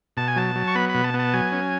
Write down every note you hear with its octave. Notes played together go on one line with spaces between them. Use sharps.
B2 A5
G#5
F#3 A5
F#3
C#6
B3 B5
B5
B2
A5
B3
A5
F#3 G#5
C#4